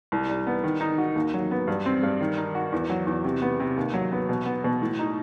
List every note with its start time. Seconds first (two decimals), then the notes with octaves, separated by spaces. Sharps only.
0.12 C2
0.29 G3
0.47 B3
0.64 D#3
0.81 D#4
0.98 F#4
1.16 D#2
1.34 F#3
1.51 B3
1.67 G2
1.86 C4
2.03 G2
2.21 D#3
2.37 D#4
2.55 F#4
2.72 E2
2.90 F#3
3.07 E2
3.24 C3
3.42 B3
3.60 C3
3.77 D#2
3.94 F#3
4.12 B3
4.29 B2
4.46 B3
4.64 B2
4.82 A2
4.99 D#4